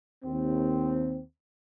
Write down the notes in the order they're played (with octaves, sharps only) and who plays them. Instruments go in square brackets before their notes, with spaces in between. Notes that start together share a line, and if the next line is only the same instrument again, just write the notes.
[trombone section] D#2 C4